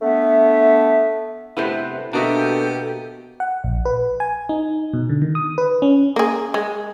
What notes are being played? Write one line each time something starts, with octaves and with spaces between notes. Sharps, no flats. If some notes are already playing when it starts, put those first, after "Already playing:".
A3 B3 D4 E5
C3 A3 B3 E4 B4 C5
B2 A#3 D4 F#4 G4 A4 D#5 E5
F#5
A#1
B4
G#5
D#4
B2
D3
D#3
D#6
B4
C#4
A#3 G#4
G#3